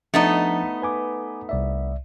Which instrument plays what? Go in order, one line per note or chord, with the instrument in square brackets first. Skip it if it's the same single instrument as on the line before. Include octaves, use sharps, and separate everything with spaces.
[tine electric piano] F3 D4 A6 [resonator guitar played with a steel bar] A3 B3 D#4
[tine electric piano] B4 G#5 D6
C2 D5 E5